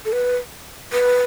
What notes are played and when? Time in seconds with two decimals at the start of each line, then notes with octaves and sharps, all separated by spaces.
0.05 A4
0.12 B4
0.93 B4